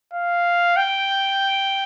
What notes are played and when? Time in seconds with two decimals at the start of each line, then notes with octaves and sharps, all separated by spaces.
0.13 F5
0.77 G5